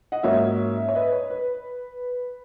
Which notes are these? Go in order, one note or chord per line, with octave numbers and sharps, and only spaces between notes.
D#5 F#5
G#2 F#3 A#3 C#4 C#5 E5
C#5
B4 D#5
C#5
B4